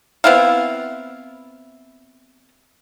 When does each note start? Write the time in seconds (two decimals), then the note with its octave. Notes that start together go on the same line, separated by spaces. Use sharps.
0.24 B3 C4 E4 F5